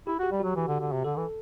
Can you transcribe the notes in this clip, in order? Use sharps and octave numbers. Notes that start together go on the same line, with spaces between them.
E4 G4
F#4
G4
G3
F#3 F#4
E3
D3
D3
C3
D3 A4
E3